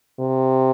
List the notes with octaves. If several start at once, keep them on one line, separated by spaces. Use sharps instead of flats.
C3